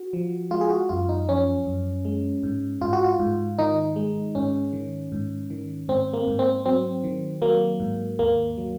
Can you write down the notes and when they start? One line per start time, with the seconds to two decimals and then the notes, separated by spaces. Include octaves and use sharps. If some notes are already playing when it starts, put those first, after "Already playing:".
Already playing: F#4
0.13 F3
0.51 G#3 F4
0.61 G#4
0.70 F#4
0.89 F#2 F4
1.09 D#4
1.28 F3 C#4
1.66 F#2
2.05 G#3
2.43 G#2
2.81 G#2 F4
2.93 F#4
3.04 F4
3.19 G#2
3.58 D#3 D#4
3.96 G#3
4.35 G#2 C#4
4.73 D#3
5.12 G#2
5.50 D#3
5.88 G#2 C4
6.13 A#3
6.27 G#2
6.39 C4
6.66 F#3 C4
7.04 D#3
7.42 F#3 A#3
7.80 G#2
8.19 D#2 A#3
8.58 F#3